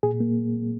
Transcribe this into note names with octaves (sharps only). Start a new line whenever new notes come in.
A#2 G#4
A#3